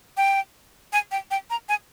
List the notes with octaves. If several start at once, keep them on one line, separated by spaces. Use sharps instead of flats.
G5
G#5
G5
G5
A#5
G#5